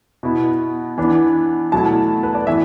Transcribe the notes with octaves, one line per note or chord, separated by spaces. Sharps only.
B2 B3 E4
E3 B3 D4
B2 F#3 A3 E4 A5
B4
D5
A2 E3 B3 E5